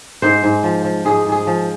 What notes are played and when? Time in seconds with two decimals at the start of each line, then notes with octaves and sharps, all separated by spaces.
0.22 G#2 C5
0.44 G#2
0.64 F3
0.84 F3
1.05 G#2 G#4
1.26 G#2
1.32 G#4
1.47 F3